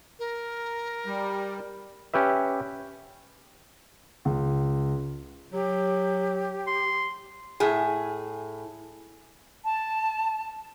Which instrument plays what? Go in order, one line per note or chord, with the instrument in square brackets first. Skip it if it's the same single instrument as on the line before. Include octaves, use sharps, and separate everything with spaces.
[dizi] A#4
[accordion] G3
[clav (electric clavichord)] C#4 G4 B4 E5
[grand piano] C#2
[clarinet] F#3 [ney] G4
[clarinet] C6
[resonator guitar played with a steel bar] A2 G#4
[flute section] A5